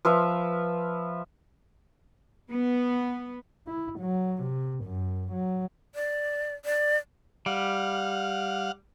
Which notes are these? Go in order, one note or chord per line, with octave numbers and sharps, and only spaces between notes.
F3 B4 E5 F5
B3
E4
F#3
C3
F#2
F#3
D5
D5
G3 F5 F#5